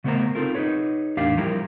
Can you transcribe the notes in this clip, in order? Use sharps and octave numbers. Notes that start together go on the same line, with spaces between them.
C#3 A3 B3 A#4 C5 A#5
C4 D#4 F4 A4 A#4
D#4 E4 G#4 B4 C#5
E2 A2 D4 G4 A#4 F5
F3 G3 E4 G4 A#4